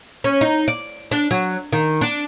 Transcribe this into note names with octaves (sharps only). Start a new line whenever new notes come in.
C#4
D#4
D5
D4
F#3
D#3
D4